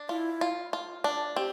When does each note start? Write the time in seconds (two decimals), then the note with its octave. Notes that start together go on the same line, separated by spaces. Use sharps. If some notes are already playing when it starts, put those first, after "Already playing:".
Already playing: D4
0.09 E4 F4
0.41 F4
0.73 F4
1.04 D4
1.36 C4 G4